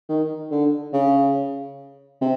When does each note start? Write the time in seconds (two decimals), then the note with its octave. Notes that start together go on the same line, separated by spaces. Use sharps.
0.08 D#3
0.51 D3
0.93 C#3
2.21 C3